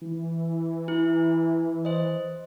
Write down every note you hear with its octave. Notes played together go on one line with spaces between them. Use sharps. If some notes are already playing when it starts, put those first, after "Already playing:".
E3
E4
C5 D#5